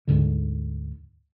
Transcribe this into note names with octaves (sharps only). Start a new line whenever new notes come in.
D2 G#2 D3